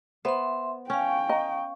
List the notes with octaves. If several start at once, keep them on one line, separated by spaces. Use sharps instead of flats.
B3 C5 E5 C6
C#4 F5 G5 C#6
D#5 A#5